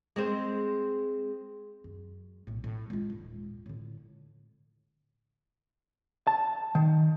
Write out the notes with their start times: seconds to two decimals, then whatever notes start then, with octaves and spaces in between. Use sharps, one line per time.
0.16 G#3 C4 C5
1.84 F#2
2.47 B1 A2
2.64 A2
2.90 G#3 F4
3.10 D#1 G#2
3.66 A2 D3
6.27 A5
6.75 D#3